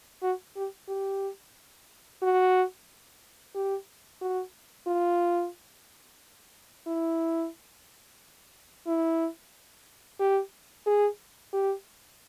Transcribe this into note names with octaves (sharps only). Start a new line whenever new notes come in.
F#4
G4
G4
F#4
G4
F#4
F4
E4
E4
G4
G#4
G4